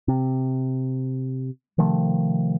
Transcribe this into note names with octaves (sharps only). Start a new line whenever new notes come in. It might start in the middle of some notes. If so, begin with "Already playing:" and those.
C3
C3 D#3 F3 A3